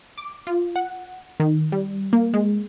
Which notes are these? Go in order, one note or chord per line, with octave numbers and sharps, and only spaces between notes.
D6
F4
F#5
D#3
G3
A#3
G#3